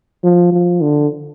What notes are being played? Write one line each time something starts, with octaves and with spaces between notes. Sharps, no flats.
F3
F3
D3